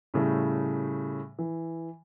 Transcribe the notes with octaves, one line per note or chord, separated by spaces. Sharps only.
A2 C#3 G3 A3
E3